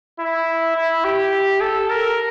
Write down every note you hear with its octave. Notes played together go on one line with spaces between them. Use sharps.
E4
E4
G4
A4
A#4